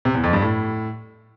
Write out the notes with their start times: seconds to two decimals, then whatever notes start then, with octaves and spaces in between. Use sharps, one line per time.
0.05 C3
0.14 E2
0.24 F2
0.33 G2
0.42 A2